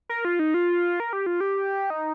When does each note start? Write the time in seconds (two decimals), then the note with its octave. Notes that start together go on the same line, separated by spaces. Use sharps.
0.09 A#4
0.25 F4
0.39 D#4
0.54 F4
1.00 A#4
1.13 G4
1.26 F4
1.41 G4
1.90 D#4